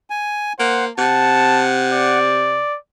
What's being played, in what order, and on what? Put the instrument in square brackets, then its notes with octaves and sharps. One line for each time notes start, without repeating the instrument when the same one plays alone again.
[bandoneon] G#5
[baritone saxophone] A#3 [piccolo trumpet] C5 [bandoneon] F#5
[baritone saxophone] C3 [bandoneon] F#5 [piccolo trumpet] A5
[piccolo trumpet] D5